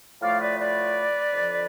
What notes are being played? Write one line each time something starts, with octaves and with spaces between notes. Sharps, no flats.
A2 F3 A3 D5 F5
B4 D5
B4 D5
F2 D3 F3